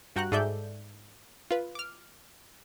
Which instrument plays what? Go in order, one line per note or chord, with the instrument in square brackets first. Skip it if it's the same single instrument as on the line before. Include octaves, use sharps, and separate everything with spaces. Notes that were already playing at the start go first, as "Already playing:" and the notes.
[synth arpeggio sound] G2 F#4 G5 A#5 C#6 F#6
G#2 G#4 A4 D5 E5 G6
F4 B4
D6 F6